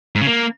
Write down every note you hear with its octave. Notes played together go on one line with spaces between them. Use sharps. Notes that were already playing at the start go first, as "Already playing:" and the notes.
G#2
C#3
A#3